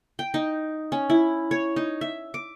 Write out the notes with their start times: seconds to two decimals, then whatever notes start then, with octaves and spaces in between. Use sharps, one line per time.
0.19 G5
0.34 D#4
0.92 C#4
1.10 E4
1.51 C#5
1.76 D#4
2.01 E5
2.34 D6